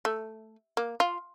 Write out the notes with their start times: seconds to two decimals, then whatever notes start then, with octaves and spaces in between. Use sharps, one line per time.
0.05 A3
0.77 A#3
1.00 F4